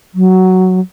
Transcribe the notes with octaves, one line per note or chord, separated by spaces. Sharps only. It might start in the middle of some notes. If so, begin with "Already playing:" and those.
F#3